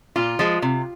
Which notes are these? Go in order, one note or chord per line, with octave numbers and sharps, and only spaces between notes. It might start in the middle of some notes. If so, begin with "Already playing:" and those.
A#2 F4
F3 G#3
C3